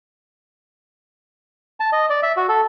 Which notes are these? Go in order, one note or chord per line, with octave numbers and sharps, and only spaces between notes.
A5
D#5
D5
E5
F#4
A4